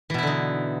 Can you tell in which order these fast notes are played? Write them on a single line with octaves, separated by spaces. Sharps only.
E3 B2 E4 D3 D#4